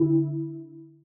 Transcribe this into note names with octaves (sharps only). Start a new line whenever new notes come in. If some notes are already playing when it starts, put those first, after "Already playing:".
Already playing: D3 E4